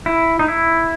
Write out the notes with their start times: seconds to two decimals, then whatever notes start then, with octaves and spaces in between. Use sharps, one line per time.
0.06 E4
0.39 D#4
0.48 E4